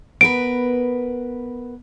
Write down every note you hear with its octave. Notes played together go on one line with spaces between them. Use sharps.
B3 A#4 B4 D7